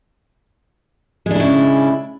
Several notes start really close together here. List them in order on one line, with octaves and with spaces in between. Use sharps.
G#3 D4 E4 C#3